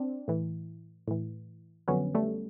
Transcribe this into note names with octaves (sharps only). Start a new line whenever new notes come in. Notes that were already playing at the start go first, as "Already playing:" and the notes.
Already playing: C4 D4
A2 E3
A2 E3
F2 D3 F#3 B3 C#4
G3 A3